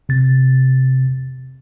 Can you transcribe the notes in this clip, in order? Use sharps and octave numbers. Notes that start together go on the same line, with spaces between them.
C3 A6